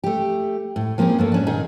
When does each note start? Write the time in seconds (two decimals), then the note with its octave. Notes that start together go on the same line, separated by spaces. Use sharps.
0.04 A3 G4
0.76 A2
0.98 F3 A#3 C4 C#4 G#4
1.18 G2 A3 A#3
1.32 G#2 C#4 D4
1.47 A#2 D#3 D#4 G#4